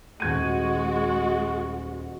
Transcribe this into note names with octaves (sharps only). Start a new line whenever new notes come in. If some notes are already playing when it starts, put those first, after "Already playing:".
D#1 G#3 F#4 G#6 D#7